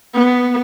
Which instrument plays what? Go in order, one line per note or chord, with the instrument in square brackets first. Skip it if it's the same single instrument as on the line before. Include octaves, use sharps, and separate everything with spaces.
[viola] B3